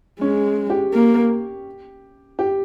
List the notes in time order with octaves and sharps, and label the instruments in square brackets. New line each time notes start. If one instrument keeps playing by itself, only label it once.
[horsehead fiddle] G#3 [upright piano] C#4
[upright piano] G4
[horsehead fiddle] A#3
[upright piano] G4